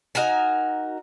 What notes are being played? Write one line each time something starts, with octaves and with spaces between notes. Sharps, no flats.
D#4 F#4 A#4 G#5